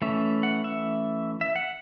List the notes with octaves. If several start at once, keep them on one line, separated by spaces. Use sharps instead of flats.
E3 A3 C#4 E5
F#5
E5
E5
F#5